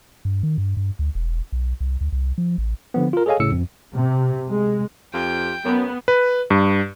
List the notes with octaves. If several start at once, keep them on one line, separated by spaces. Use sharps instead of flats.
G2
D#3
G2
G2
D2
E1
B1
C2
D2
C2
F3
A1
D3 F3 B3
F4 A#4
G#4 A4 C#5 D#5 F5 G#5
G1 A2 C#3 E6 C#7
F2
C3
G#3
F2 F4 G4 G5
F#2 B3
B4
G2